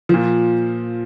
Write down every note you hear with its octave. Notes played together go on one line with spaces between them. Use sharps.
A#2 F3